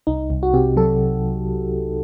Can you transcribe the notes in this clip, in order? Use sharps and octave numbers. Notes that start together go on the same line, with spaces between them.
C2 D#4
C2
F#4
C3 G4
F#3 A4